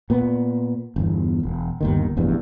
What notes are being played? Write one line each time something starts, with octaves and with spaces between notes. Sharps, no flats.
A#2 B3
G1 E2
E1
G1 D#2 D#3
F1 A#1 E2 G2